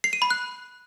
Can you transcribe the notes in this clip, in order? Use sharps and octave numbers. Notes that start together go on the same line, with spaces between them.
C7
D#7
B5
F#6